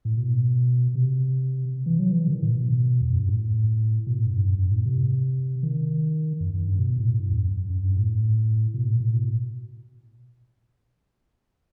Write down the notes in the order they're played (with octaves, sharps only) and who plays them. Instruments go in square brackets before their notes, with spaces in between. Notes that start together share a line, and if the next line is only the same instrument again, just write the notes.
[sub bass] A2
B2
C3
E3
F#3
E3
C3
D#3
A2
B2
E2
F#2
G2
A2
B2
A2
G2
G2
F#2
F#2
A2
C3
D#3
F#2
F#2
G2
B2
A2
G2
F#2
E2
F#2
F#2
G2
A2
B2
A2
A2
B2